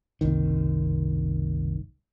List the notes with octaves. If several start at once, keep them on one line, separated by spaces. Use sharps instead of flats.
F#1 C2 D#3